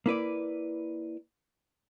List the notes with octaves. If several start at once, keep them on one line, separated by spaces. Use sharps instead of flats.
A#3 E4 B4 D5